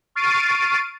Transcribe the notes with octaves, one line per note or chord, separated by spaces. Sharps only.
C#6 F6 A6 C7 D7 D#7